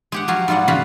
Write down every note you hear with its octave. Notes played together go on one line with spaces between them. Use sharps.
G#3 G4 F#5
F3 F#3 F#4 F5 G#5
G#2 G3 F4 D5 F#5
C#3 F3 F#4 F5 B5